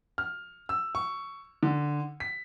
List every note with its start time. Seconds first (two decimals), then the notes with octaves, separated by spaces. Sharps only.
0.18 F6
0.69 E6
0.95 C#6
1.63 D3
2.20 B6